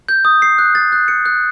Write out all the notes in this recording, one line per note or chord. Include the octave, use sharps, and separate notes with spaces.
G6
D#6
C7
F#6
A6
F#6
C#7
F#6